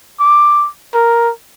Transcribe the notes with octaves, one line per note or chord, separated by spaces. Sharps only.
D6
A#4